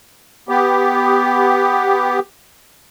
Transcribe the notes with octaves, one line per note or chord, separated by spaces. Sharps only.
B3 G4